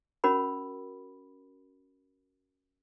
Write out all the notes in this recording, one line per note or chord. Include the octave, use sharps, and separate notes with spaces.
C#4 F#4 A#4 B5